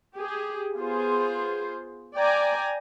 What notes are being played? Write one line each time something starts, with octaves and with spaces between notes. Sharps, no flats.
G4 G#4
B3 F4 G#4 C5
D5 G5 G#5 A#5